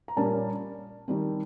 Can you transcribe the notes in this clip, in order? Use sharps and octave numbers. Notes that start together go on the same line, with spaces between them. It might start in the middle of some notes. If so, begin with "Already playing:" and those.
A#5
A#2 G3 A#3 C#4 A5
D#3 G3 C4